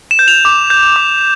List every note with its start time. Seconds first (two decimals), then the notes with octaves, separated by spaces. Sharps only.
0.11 E7
0.19 G6
0.28 F7
0.45 D6
0.70 G6
0.96 D6